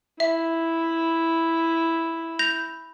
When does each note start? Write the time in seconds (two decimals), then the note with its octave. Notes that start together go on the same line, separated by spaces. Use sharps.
0.20 E4 E5
2.39 G6 A#6 F7